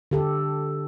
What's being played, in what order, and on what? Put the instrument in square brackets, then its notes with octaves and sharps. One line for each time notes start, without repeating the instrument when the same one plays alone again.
[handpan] D3 G4 A4